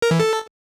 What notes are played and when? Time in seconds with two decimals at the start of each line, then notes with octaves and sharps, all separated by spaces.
0.02 A#4
0.11 E3
0.20 A4